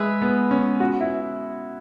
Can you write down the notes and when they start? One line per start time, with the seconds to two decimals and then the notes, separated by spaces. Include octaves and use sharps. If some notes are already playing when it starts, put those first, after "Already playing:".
Already playing: G#3 G#4 B4 E5
0.22 B3
0.51 C#4
0.80 F#4
1.01 E4